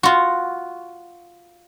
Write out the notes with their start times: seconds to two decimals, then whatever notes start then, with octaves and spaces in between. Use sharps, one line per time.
0.03 F4 F#4